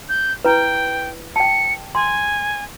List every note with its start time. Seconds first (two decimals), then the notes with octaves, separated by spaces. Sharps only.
0.09 G6
0.45 E4 B4 G5
1.36 G5 A5 C#7
1.95 G#5 C6